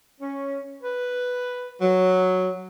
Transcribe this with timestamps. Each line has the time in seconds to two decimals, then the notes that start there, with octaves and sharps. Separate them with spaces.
0.20 C#4
0.82 B4
1.81 F#3